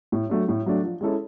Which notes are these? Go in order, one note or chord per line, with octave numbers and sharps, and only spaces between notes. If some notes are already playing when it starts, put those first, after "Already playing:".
A2
F#3 A3 D4
A2
F#3 A3 D4
F3
G#3 C#4 E4 A4